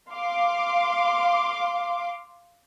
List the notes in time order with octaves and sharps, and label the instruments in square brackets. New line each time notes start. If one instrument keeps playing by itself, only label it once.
[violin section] F5 C6 D6